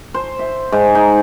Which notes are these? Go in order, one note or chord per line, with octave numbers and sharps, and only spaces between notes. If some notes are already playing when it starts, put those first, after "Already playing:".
C5
E5
G#2
D#4